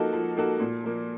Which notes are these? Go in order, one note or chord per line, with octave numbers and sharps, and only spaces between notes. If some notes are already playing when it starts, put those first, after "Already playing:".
Already playing: F3 A#3 D#4 F#4 A4
F3
A#3 D#4 F#4 A4
A#2
F3 A#3